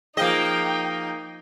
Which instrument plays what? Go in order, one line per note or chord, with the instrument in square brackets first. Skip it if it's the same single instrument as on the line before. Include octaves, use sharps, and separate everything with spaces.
[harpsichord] F3 G#4 [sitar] A#3 D#5 [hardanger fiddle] D#4 [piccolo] G5